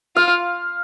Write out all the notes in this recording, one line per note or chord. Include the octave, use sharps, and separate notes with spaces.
F4 F5